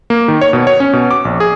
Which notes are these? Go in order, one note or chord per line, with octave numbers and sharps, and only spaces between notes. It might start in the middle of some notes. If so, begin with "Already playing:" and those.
A#3
D#3
C#5
B2
C#5
C#4
B2
D6
A#1
G#4